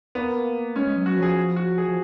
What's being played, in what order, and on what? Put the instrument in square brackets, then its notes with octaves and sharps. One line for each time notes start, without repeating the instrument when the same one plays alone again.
[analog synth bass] A#3 [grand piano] B3
[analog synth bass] G#3 [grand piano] C#4
[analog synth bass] G#3
F#3
[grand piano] F#4
[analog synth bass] F3
[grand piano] G#4
F#4
G#4
[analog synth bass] F3